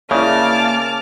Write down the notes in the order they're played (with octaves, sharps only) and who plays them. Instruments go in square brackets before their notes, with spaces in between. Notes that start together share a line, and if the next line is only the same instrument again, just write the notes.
[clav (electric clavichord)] C#3 [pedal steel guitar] A#3 [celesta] E4 D5 E5 [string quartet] A5 D6 F6